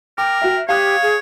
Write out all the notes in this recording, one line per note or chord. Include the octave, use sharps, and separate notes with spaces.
A#4 G5 D6
F#4 E5
G4 C#5 F5 D#6 F#6
G#4